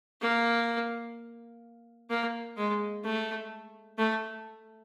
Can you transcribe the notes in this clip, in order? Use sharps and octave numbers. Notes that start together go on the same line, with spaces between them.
A#3
A#3
G#3
A3
A3